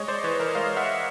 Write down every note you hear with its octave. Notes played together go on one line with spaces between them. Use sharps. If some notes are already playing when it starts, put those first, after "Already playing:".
Already playing: G#3 C#5 D#5
C5 D5
E3 B4 C#5
A#4 C5
G#3 D#5 F5
E5 F#5